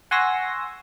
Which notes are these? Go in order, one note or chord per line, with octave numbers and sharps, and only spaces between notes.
F#5 G#5 C6 C#6 E6 A#6